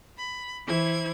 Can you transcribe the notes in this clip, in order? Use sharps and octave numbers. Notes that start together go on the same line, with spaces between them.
B5
E3 E4 C5 G#6